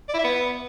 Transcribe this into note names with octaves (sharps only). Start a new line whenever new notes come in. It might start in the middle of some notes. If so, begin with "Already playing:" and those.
D5
E4
E5
B3